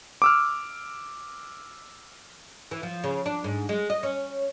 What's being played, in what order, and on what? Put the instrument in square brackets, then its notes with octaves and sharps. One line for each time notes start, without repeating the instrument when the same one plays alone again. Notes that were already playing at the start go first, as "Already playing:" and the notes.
[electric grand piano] D6 E6 F6
[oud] E3
F3
C#3
D4
G#2
G#3
D#5
C#4